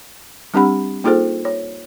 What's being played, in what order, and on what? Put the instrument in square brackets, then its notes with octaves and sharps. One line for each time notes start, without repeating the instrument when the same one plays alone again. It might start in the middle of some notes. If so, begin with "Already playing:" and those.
[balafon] G3 C4 D4 G4 F#5 B5
A#3 D#4 F4 G#4 A4 C5
C#5